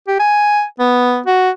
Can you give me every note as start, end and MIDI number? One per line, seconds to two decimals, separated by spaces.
0.08 0.18 67
0.19 0.63 80
0.79 1.20 59
1.26 1.50 66